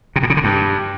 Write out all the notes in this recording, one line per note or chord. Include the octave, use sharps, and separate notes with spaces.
C3
A2
C#3
D3
G2